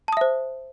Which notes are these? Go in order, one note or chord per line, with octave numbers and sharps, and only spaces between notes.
C5 E5 A5 D#6